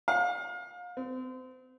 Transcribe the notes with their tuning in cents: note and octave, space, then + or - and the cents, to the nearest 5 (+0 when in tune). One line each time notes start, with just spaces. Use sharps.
F5 +35
C4 -35